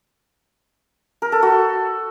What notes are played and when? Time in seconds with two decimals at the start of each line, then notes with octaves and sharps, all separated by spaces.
1.22 A#4
1.32 A4
1.42 F#4